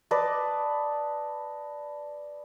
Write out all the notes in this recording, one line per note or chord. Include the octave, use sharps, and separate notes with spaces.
B4 D5 D#5 A5